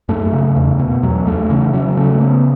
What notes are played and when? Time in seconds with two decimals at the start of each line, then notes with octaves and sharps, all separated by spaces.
0.09 F#2 A3
0.33 C#3
0.56 E2
0.79 B2
1.03 E2 F#3
1.27 E2 A3
1.50 C#3 E3
1.73 C#3 F#3
1.97 C#3 A3
2.20 C#3 B3